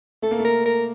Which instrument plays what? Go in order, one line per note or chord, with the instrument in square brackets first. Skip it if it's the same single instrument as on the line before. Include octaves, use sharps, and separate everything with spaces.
[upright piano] A3 [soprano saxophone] A4
[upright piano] A#3
A3
[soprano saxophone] A#4
A#4